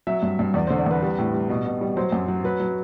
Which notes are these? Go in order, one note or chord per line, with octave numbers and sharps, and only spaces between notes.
F#3 E5
G2
G2
E2 D5
C5
D3
D5
E2 B4
G3 B4
A2
G3
B2
B2
G3
F#3 C5
F#2
F#3
F#3 B4
F#3